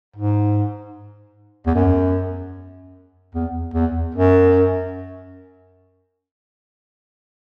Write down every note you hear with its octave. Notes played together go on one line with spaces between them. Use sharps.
G#2
E2
F#2
E2
E2
F#2